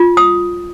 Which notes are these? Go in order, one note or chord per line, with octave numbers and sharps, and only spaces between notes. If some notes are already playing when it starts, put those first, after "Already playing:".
Already playing: F4
D#6